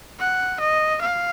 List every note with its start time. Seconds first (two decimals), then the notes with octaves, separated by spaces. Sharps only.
0.20 F#5
0.60 D#5
1.02 F5